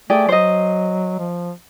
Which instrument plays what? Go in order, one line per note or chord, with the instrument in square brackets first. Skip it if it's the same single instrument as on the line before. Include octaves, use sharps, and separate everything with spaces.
[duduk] A3 [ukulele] G4 G#4 D5
[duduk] F#3 [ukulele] C5 D#5
[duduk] F3